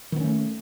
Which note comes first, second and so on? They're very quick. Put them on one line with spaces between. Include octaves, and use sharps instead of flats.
D#3 B3 C#4 A3